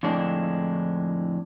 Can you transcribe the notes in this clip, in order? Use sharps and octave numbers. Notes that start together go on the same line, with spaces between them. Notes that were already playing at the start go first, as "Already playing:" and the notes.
F2 A2 D3 G#3 D4